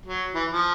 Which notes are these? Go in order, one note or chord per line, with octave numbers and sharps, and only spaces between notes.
F#3
E3
F3